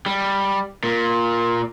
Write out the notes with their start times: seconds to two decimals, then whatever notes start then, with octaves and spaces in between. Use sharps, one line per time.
0.06 G3
0.83 A#2